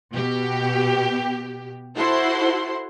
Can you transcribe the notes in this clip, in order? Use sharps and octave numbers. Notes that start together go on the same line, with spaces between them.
B2 G4
E4 F#4 A4 C5 F#5 C6